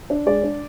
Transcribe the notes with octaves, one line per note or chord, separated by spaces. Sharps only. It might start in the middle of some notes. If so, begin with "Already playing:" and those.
D4
G#3 D5
D4